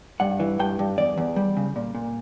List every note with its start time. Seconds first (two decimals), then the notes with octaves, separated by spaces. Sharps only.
0.20 G2 F#5
0.40 E3
0.59 G2 G5
0.79 G2
0.98 E2 D5
1.18 E2
1.36 G3
1.57 C#3
1.76 A#2
1.95 A#2